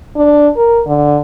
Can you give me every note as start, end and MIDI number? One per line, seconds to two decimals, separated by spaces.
0.16 0.50 62
0.56 0.82 70
0.87 1.20 50